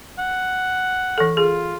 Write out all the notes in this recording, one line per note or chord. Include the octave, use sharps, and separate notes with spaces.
F#5
E3 A4
F4 G#4